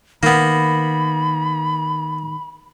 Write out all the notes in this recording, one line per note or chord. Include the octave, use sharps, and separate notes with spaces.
D#3 A#3 B3 B5